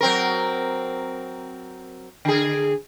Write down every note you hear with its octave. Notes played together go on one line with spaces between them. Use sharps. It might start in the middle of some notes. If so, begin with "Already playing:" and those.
F#3 C4 A#4
D3 G#4